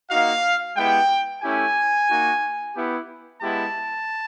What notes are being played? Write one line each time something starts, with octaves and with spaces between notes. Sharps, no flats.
A#3 D#4 F#4 F5
G#3 B3 E4 G4 G5
A3 C#4 E4 G4 G#5
A#3 D#4 F#4
B3 E4 G4
G#3 B3 E4 G4 A5